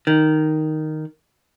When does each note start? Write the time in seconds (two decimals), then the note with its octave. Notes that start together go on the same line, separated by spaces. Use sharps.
0.07 D#3